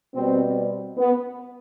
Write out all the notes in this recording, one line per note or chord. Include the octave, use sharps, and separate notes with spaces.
B2 G3 C4
B3